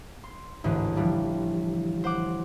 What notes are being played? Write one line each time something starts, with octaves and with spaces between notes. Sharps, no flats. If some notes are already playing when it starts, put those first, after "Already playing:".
C6
A1 D2 G#2 E3
D3 E3 F3 G3
C5 F#5 D6